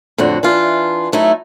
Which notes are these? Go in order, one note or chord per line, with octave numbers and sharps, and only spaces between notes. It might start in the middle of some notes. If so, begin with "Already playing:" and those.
F2 A2 D3 F#4
E3 D4 F4
F#3 A3 D#4 E4